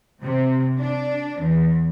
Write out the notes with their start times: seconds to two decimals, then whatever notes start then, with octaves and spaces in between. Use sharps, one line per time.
0.22 C3
0.78 D4
1.40 E2